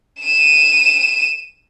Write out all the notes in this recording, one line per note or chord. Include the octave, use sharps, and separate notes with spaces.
D#7 E7